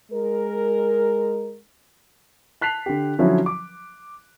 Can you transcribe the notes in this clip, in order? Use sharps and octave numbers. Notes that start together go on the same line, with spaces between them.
G#3 A#4
A5 F#6 B6 C7 F7
D3 G4
D3 F3 F#3 C#4 E4 F#4
D6